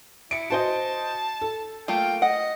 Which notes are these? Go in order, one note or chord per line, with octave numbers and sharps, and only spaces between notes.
E4 C#7 D7
F#4 C5 D#5 A5
A4
A3 A#3 F4 G5
D#5 F#5